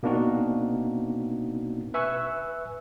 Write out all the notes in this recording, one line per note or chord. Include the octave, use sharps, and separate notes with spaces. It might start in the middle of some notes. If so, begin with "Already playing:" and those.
B2 A#3 C4 D4 D#4 F#4
B4 E5 G#5 C#6 E6 F#6